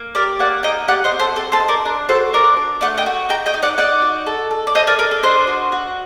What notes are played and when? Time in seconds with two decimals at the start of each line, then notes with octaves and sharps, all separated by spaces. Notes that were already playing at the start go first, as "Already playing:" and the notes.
Already playing: A#3
0.15 G4 A#4 D5
0.39 A#3 D5 F#5
0.63 D#4 D#5 G5
0.88 G4 D5 F#5
1.04 C5 D#5
1.11 C4
1.19 A4 C5
1.36 C4 A4
1.52 A4 C5
1.60 D#4
1.68 A#4 D5
1.85 D4 A#4
2.09 F#4 A4 C5
2.33 D4 A#4 D5
2.57 D4
2.81 A3 D5 F#5
2.98 D#5 G5
3.06 F#4
3.29 D#4 G5 A#5
3.46 D#5 G5
3.54 D#4
3.62 D5 F#5
3.78 D#4 D5 F#5
4.02 F#4
4.26 A4
4.51 A4
4.67 D5
4.75 A4 C5 D#5
4.87 A#4 D5
4.99 D4 A#4
5.11 A4
5.23 D4 C5 D#5
5.47 F#4
5.72 F#4